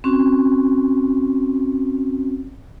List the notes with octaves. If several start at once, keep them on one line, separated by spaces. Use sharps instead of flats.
C4 C#4 F#4